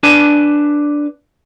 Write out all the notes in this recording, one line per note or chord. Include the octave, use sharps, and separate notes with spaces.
D4 B4 G#5 A5